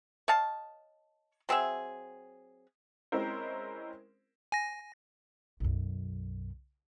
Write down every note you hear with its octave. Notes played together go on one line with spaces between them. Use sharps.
C#5 D#5 F5 A5
F#3 C4 G#4 E5
G#3 C4 C#4 E4 A#4 C5
G#5 A#6
B1 F#2